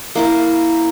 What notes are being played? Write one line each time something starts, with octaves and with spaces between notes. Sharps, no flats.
A#3 E4 A#4